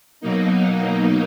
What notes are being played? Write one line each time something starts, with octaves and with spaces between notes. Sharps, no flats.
B2 F#3 A#3 D#4